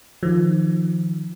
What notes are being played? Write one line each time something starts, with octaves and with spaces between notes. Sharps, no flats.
D#3 F3